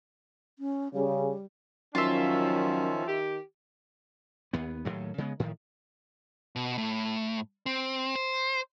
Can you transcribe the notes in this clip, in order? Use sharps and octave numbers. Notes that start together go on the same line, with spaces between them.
C#4
C#3 G3
F#2 D#3 F3 C#4 F4 E5
D#3 G4
D#2 B3
D#2 A2 F#3
C#3 G#3 B3
A2 D#3 F3
B2
A2
C4
C5